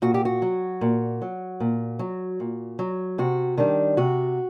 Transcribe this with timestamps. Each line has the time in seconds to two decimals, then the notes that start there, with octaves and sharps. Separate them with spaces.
0.02 A#2 F#4
0.14 G4
0.25 F#4
0.42 F#3
0.81 A#2
1.22 F#3
1.60 A#2
1.99 F#3
2.40 A#2
2.79 F#3
3.18 C3 F#4
3.58 D#3 G3 D4
3.97 C3 F#4